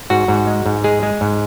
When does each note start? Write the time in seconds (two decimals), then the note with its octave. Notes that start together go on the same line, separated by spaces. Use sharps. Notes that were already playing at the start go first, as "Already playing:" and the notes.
0.10 G#2 F#4
0.28 G#2
0.47 G#3
0.66 G#2
0.84 G#3 G#4
1.03 G#3
1.21 G#2